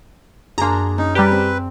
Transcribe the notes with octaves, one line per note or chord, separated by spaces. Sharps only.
F#2 A#3 D4 G#4 G#5 A#5 C6
C#4 D#4
G3 G4 B4 D5 A#5 D6
C4